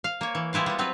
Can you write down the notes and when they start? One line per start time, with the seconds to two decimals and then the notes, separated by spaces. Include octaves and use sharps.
0.04 F5
0.21 A#3 C#5
0.35 E3
0.53 G3 G#3 E4 F4 F5
0.66 G3 B3
0.78 F#3 C4 F4 B4